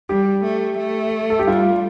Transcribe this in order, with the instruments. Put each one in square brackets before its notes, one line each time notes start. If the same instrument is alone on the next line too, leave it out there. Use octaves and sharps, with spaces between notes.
[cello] G3 [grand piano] G4
[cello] A3
A3
[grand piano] A4
G4
[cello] G3 [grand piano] F4